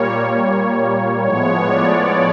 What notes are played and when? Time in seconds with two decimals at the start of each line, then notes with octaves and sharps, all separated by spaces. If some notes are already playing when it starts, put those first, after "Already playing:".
Already playing: A#2 G3 A#3 C#5
1.24 A2 F3 G#3 B3 C#5
1.68 D5